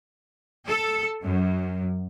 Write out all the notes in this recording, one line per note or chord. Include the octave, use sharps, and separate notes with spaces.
A4
F#2